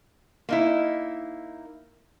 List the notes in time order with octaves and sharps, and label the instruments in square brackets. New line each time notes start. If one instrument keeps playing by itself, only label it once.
[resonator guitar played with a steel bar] A#3 D#4 E4